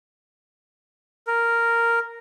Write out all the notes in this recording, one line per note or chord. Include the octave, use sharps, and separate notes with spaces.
A#4